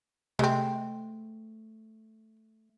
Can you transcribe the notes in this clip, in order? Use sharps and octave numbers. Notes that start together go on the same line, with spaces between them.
C3 G#3 A3 C4